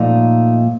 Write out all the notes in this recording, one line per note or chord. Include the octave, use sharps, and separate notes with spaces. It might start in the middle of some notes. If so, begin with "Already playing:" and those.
Already playing: A#2 F3 A3 D#4